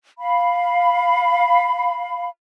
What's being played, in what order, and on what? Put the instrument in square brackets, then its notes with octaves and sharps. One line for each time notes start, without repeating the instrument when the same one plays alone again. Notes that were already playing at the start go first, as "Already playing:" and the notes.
[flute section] F5 B5